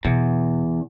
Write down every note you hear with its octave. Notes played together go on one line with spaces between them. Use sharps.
E2 B2